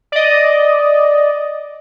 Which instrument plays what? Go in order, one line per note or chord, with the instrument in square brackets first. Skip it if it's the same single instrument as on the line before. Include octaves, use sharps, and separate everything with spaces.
[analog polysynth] D5 D#5